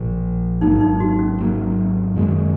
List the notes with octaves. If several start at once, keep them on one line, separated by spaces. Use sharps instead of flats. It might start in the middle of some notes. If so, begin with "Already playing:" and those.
Already playing: A#1 A#2 F3
G#1 G#2 F#3 A#3 D#4
D#4
F#4
C#4
G#1 G#2 F#3 A#3
F#2 D#3 G#3